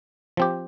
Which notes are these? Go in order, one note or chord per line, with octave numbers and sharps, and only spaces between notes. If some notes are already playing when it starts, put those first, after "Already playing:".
F3 C4 G4